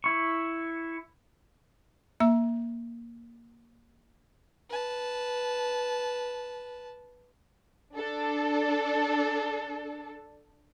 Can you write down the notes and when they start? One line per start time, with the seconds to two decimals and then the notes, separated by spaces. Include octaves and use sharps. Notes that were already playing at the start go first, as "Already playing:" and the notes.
0.04 E4 C#6
2.20 A#3 E5 E6
4.69 B4 A5
7.95 D4 A4